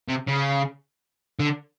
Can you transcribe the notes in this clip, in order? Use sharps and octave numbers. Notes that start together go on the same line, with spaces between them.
C3
C#3
D3